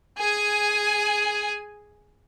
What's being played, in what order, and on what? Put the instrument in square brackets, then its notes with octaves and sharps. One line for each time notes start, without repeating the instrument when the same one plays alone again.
[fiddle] G#4 G#5